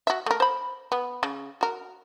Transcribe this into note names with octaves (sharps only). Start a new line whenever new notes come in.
F#4 E5
A3 A#4
C5 B5
B3
C#3
F#4 A#4